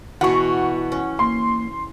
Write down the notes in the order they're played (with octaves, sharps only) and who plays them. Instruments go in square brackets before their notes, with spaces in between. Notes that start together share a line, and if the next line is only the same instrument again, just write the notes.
[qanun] B2 E3 [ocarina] F#4 [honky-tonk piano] F#5 C#6
[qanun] C#4
[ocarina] A#3 [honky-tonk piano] C6